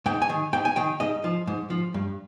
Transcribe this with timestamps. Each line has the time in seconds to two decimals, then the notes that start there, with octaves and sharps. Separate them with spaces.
0.06 G#2 G5
0.22 G#5
0.29 D#3
0.53 G#2 G5
0.65 G#5
0.76 D#3 G5
1.00 G#2 D#5
1.24 F3
1.47 G#2
1.70 F3
1.94 G2